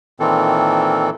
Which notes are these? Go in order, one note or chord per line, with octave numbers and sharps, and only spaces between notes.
A#2 D#3 E3 C4 A4